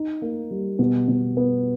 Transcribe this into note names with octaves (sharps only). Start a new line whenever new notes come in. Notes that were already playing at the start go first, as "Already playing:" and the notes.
Already playing: D#4
A#3
G3
B2
B2
B3